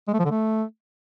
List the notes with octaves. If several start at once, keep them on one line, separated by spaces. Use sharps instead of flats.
G#3
A3
F3
D3
A3